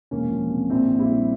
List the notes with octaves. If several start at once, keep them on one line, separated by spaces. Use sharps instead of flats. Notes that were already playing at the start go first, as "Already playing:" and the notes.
E1 A#3 C#4
F3
C3
A#1 C4 E4
A#1
E4 G4
G3